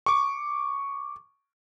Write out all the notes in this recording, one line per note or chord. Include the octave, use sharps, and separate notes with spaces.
C#6 D6